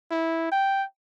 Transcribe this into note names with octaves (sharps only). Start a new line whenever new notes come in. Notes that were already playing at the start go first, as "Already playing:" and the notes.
E4
G5